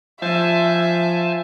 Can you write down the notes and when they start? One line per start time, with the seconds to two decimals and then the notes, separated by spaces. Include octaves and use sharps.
0.22 F3 C5 E5 G#5 A5